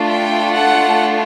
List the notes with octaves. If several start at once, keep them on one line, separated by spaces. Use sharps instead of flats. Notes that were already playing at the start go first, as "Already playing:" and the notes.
Already playing: A3 D4 F4 A4
G5
F#5